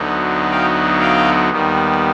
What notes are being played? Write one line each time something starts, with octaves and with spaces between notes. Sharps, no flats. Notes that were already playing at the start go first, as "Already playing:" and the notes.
Already playing: D2 D3 F#3 B3 D#4
F5 G5
F5 G5
D#2 D#3 G3 B3